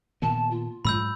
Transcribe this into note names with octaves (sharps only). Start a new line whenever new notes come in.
A#2 D#3 B3 A5
F4
G#2 F#3 G#3 B5 E6 G6